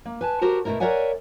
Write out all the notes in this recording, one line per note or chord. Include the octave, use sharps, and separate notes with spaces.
A#3
B4 G#5 A5
F#4 G4 A#4 C5
B2 G#3 A3 E4 A#4
A#4 C#5 D5 E5 F#5 G#5